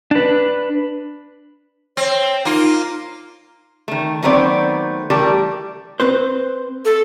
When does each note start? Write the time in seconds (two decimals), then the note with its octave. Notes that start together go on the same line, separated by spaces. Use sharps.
0.11 D4 B4
1.97 C4 C#5
2.45 A#3 D#4 F4
3.88 D#3 A3
4.23 D#3 F#3 A3 B3 C4 D5
5.10 E3 G3 A3 G4 A4 A#4
6.00 C4 B4 C5
6.85 A4